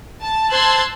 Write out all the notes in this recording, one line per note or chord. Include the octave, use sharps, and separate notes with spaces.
A5
C5 A5 C6 E6 F#6 G#6